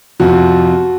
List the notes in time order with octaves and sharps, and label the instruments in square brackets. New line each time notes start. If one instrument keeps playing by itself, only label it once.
[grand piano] F2 C3 F3 F#4